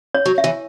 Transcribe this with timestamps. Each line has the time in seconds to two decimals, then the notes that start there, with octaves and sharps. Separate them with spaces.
0.14 C#5
0.26 F#3
0.38 E5
0.44 E3